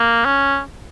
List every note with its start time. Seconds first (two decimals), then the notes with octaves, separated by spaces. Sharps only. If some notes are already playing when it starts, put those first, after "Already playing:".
Already playing: A#3
0.25 C#4